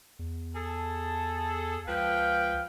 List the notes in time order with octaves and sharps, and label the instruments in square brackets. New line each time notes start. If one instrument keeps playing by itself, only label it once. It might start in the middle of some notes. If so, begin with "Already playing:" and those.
[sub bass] E2
[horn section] G#4 A4 [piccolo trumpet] A5
[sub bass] C#2 [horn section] F3 B4 G5 [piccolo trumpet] F5